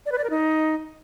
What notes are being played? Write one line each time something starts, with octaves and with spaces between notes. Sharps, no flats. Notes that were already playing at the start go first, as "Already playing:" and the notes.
D5
B4
D5
A#4
D#4